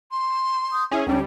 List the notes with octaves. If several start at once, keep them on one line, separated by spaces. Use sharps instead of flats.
C6
D#6 G6
C#4 E4 G#4
D2 G3 C#4 D4 G5